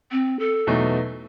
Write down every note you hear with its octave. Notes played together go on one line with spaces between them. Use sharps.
C4
A4
E2 B2 F#3 A3 D#4